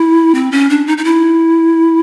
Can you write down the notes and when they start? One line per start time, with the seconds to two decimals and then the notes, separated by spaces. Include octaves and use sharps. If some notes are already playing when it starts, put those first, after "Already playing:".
Already playing: E4
0.35 C4
0.52 C#4
0.70 D4
0.87 D#4
0.98 D#4
1.04 E4